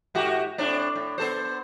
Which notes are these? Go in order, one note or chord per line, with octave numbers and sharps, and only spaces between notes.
G#2 F#4 G4
A2 C4 D4
A2
B3 A4 C5